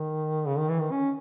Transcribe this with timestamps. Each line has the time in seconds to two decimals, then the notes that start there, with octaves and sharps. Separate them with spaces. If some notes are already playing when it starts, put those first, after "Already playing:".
Already playing: D#3
0.47 C#3
0.58 D#3
0.69 E3
0.80 D#3
0.91 C#4